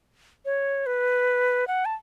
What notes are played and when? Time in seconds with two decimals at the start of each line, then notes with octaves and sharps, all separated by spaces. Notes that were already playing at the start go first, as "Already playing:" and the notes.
0.45 C#5
0.86 B4
1.67 F#5
1.85 A5